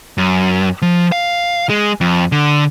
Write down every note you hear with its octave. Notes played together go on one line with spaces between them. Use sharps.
F#2
F3
F5
G#3
F2
D3